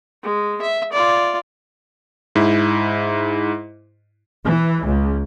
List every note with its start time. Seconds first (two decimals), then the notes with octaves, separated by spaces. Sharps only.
0.23 G#3
0.62 E5
0.92 F4 D5
2.35 G#2 E4
4.45 E3
4.84 C#2